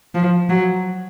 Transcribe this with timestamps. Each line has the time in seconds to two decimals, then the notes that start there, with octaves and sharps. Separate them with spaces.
0.15 F3
0.49 F#3